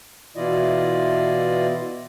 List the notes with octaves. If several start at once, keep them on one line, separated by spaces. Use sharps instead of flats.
B2 E3 E4 F4 D5 D#5